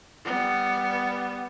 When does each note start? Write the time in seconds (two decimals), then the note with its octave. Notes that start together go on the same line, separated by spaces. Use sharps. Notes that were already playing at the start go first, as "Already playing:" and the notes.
0.25 G3 B3